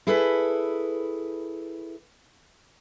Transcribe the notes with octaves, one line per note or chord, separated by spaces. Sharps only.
E4 G#4 A4 B4